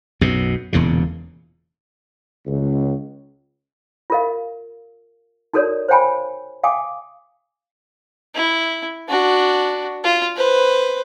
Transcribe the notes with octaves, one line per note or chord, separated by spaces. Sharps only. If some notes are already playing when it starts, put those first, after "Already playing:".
B1 F#2 B2
E1 E2 A#2 C#3
C#2
F4 G4 A#4 D#5 F5
D#4 F#4 A4 A#4 C#5 D5
C5 C#5 F5 G5 G#5 B5
F5 G5 G#5 D6 D#6
E4
D4 F#4
F4
B4 C5